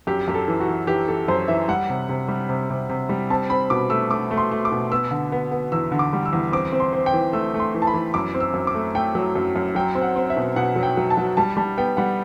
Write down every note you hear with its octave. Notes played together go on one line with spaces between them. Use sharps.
F#2 G4
F#2 G4
A4
E3
F#4
E3
E3 G4
E3 A4
F#2 C5
E3 E5
G3 F#5
C3
C3
G3
C3
C3
C3
G3
C4 A5
C4 B5
B2 D6
A3 E6
A3 D6
A3
C6
A3
D6
B2
B3 E6
D3
B3
B3
E2 E6
D3
D6
G3
E6
E2
C4 D6
C4
C6
C4
G5
E3
A3 E6
A3
C6
E3
A5
B5
E3
F#2 D6
C4
E6
F#2
D6
A3
A3 G5
F#3
F#2
F#2
F#3 G5
C4
F#5
C4
E5
B2
B2 F#5
F#3
G5
F#3
A5
F#3
G3 A5
G3 A5
B3 G5
G3 F#5